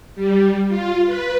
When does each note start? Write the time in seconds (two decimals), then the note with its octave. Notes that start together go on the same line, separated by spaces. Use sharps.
0.15 G3
0.68 F4
1.06 B4